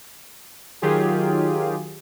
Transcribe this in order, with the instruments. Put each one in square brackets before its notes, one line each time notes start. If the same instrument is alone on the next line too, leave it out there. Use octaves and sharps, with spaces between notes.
[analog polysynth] D#3 F#3 F4 G4 G#4